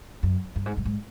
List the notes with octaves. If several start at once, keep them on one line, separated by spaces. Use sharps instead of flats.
F#2
G2
G#2
G2
G#2